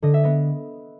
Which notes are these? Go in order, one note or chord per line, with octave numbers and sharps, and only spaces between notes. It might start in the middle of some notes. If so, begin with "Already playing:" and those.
D3 D#5
E5
B3 D#5